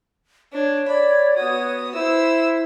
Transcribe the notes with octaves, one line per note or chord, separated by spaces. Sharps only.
D4 C#5
D5 B5
B3 F#4 D#6
E4 C5 E6